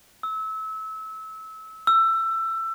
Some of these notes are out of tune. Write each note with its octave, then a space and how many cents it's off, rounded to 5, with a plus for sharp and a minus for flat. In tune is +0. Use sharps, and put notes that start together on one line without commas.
E6 -25
E6 +20